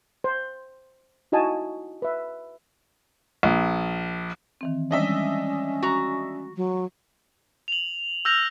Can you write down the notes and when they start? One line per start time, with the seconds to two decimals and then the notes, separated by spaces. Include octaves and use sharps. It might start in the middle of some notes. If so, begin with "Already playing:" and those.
0.24 C5
1.32 D#4 E4 F#4 D#5 G#5 A5
2.02 B4 E5
3.43 A#1
4.61 D#3 E3 C4
4.91 E3 G3 G#3 C#4 D4 D#5 E5
5.83 F#4 A#5
6.57 F#3
7.68 F7 F#7
8.25 E6 F6 G6 A#6 F7